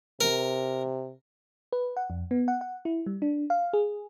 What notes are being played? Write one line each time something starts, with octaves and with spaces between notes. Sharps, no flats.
C3 A#4
B4
F#5
F2
B3
F#5
F#5
E4
G3
D4
F5
G#4